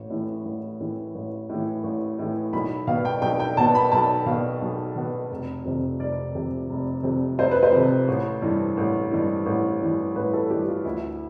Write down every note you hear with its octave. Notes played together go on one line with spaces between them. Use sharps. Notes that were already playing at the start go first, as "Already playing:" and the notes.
Already playing: A1
A2 E3
A1
A2 E3
A1
A2 E3
A1
A2 E3
B1 B5
B2 B3 F5
G5
B1 G5
G5
B2 B3 A5
B5
B1 A5
B2 B3 F5
B1
B2 B3
F1
F2 C3
F1 D5
F2 C3
F1
F2 C3
F1 C5
B4
C5
F2 C3
A1
G2 E3
A1
G2 E3
A1
G2 E3
A1 B4
A4
G2 E3 G4
F4
D2 E4